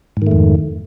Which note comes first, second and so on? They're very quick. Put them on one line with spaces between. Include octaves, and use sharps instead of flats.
G#2 D#3 A3 F2